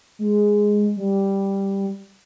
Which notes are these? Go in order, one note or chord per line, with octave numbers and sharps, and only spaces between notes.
G#3
G3